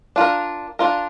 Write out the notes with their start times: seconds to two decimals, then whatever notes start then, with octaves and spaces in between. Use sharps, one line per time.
0.16 D4 F4 A#4
0.79 D4 F4 A#4